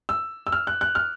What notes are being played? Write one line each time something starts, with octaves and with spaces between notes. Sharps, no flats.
E6
E6
F6
F#6
F#6
F6